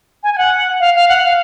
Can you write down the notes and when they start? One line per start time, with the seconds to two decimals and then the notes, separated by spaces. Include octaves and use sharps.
0.24 G#5
0.34 G#5
0.38 F#5
0.80 F5
0.95 F5
1.09 F#5
1.23 F5